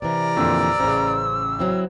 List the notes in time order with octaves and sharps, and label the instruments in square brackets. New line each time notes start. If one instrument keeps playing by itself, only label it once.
[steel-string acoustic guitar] C3 E3 [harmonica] A#4 D5
[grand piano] F2 A#2 D3 [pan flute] E6
[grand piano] A1 C#3 [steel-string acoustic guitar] C5
[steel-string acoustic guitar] F#3 C4 E4